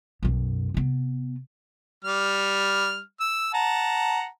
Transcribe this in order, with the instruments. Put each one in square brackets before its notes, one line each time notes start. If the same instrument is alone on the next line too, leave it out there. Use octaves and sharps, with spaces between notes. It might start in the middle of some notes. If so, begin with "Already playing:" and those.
[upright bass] B1 F#2
C3 B3
[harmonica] G3 F6
E6
F#5 A5 A#5